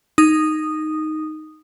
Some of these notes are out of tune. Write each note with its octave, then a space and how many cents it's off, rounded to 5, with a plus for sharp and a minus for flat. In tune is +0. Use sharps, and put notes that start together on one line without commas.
D#4 +0 D#6 -10